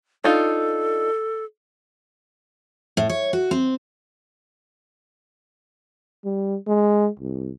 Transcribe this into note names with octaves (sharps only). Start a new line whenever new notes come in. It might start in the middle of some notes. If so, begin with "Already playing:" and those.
D4 D#4 F4 A4
A2
C#5
F#4
C4
G3
G#3
C2